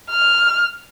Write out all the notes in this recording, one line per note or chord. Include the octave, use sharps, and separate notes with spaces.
F6